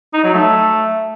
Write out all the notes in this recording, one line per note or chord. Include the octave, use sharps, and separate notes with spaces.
D#4
F#3
A3